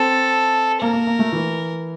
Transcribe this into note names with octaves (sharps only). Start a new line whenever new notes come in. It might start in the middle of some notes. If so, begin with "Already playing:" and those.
Already playing: C4 A4
A#3 A#4
A#3
A#3
A3
E3